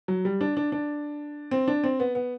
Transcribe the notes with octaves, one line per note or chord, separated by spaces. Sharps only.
F#3
G3
D4
D4
D4
C4
D4
C4
B3
B3